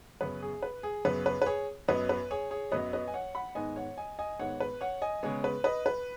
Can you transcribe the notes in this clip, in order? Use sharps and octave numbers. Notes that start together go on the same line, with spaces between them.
F#2 C#3 B3 B4
G#4
B4
G#4
F#2 C#3 B3 B4
B4
B4
G#4 C#5
F#2 F#3 B3 B4 D#5
B4
G#4 C#5
G#4 C#5
F#2 F#3 B3 B4 D#5
B4 D#5
G#5
C#5 F#5
F#5 B5
G#2 D#3 B3 D#5 G#5
C#5 F#5
D#5 G#5
D#5 G#5
G#2 D#3 B3 C#5 F#5
B4
C#5 F#5
D#5 G#5
C#3 G#3 B3 G#4 C#5
B4
B4 D#5
B4